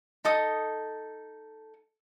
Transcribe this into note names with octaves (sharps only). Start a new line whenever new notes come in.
D#4 A4 D#6